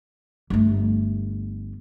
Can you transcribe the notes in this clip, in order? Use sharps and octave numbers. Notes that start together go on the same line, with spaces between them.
G1 A3